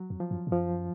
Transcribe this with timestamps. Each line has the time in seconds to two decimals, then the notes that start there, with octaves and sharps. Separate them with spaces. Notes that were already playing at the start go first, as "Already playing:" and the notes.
Already playing: F#3
0.10 F2
0.20 F3
0.31 F#2
0.47 A2
0.52 F#2 F3